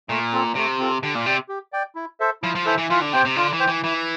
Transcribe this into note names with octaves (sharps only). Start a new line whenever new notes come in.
A#2 A3
C4 F4 A4
C3 A3
C4 F4 A4
D3 G4
A#2
C3 D5 G5
G4
D5 G5
E4
A4 C5 E5
F3 E4
F3
E3 A4 C5 E5
E3
E3 F4
D3
C3 C5 G5
C3
D3 F4
E3
C5 G5
E3
E3 E4